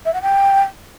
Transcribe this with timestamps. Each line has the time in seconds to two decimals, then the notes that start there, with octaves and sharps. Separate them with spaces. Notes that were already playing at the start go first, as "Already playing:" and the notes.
0.05 E5
0.13 F#5
0.22 G5